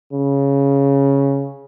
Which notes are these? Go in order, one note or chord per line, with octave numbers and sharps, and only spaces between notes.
C#3